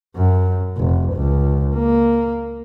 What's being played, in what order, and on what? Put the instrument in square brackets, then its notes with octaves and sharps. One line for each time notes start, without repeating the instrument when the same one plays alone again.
[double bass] F#2
F1
C#2
A#3